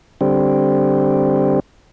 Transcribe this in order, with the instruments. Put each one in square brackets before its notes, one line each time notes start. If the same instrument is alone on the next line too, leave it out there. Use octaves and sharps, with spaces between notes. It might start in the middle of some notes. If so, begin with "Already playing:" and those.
[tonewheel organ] D3 G3 C4